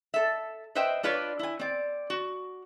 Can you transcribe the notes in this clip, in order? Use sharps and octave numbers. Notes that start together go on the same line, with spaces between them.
A4 E5
B4 C5 D#5 E5 G5
D4 F4 B4 C#5 D5
E4 G#5
C4 D5
F#4